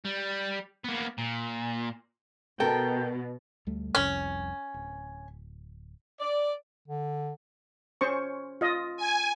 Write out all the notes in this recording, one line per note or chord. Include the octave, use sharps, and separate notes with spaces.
G3
A#3 B3
A#2
B2 A4 A#4 G5
D2 G3 A3
F1 C2 F2 C#4
D1
D5
D3
C#4 C5 C#6
F4 D#5
G#5